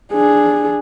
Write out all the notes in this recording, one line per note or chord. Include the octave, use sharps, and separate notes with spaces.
D4 G#4